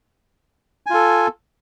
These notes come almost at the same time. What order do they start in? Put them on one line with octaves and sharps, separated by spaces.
G#5 F4 A4